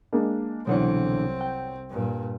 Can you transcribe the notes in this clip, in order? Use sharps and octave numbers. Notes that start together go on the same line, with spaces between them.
G#3 A#3 D4
C2 B2 D3 E3 F#3 C4 C#5
G5
G2 A#2